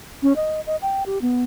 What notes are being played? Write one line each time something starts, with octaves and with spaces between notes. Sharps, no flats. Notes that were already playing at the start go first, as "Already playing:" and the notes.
C#4
D#5
D#5
G5
G4
B3